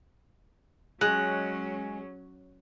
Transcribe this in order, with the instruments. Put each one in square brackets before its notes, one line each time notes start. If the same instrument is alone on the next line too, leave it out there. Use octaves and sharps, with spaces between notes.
[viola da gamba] F#3 C#4 [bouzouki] G#3 [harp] F#6